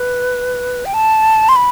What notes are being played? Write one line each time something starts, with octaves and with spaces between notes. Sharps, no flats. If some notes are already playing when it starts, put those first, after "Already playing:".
Already playing: B4
G5
A5
C6
B5